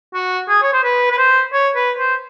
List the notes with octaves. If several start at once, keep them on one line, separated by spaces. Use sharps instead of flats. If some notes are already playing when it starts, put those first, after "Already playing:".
F#4
G#4
C#5
C5
B4
B4
C5
C#5
B4
C5